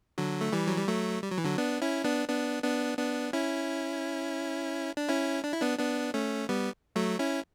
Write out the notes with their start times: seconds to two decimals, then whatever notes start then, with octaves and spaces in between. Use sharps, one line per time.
0.18 D3 F#3
0.41 A3
0.53 E3 G3
0.67 F#3
0.77 G3
0.88 F#3 A3
1.23 G3
1.31 F#3
1.38 E3
1.44 D3 F#3
1.58 B3 D4
1.82 C#4 E4
2.04 B3 D4
2.28 B3 D4
2.63 B3 D4
2.98 B3 D4
3.33 C#4 E4
4.97 D4
5.09 C#4 E4
5.44 D4
5.53 E4
5.61 B3 D4
5.79 B3 D4
6.14 A3 C#4
6.49 G3 B3
6.96 F#3 A3
7.19 C#4 E4